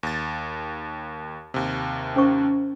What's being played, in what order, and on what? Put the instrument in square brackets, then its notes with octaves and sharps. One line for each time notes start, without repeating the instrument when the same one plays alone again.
[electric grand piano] D#2 A6
D#2 C3
[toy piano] C#4 C5 C#6